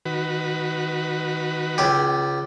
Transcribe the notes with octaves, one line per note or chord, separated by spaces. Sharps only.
D#3 F#4 B4
C#2 G4